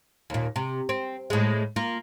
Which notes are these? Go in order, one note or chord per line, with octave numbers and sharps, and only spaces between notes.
D#2 A#2
C3
C4
A2 G#3
A#3 F4